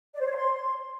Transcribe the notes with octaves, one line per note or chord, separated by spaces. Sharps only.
D5
C5
C#5
C5
C6